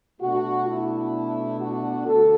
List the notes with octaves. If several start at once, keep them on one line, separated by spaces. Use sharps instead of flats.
B2 A3 D4 F#4
E4
F#4
D2 A4